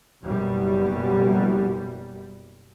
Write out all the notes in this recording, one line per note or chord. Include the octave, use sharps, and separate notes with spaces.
F#1 F#2 B2 G3